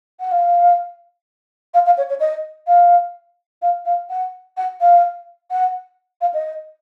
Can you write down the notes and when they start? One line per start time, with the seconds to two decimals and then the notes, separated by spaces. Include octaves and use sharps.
0.20 F#5
0.31 F5
1.74 F5
1.86 F5
1.98 C#5
2.09 C#5
2.20 D#5
2.67 F5
3.62 F5
3.85 F5
4.10 F#5
4.57 F#5
4.81 F5
5.50 F#5
6.21 F5
6.34 D#5